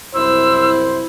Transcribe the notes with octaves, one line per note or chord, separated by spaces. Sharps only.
C2 F#2 E4 C5 E6